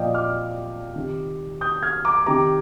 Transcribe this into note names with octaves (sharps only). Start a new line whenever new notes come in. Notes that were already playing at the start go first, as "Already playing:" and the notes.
Already playing: A#2 F3 D5 D#5 F5 G5
D6 F6
C3 D#3
D#6 G6
F6 G#6
A#5 D6
C3 D#3 A#5 D6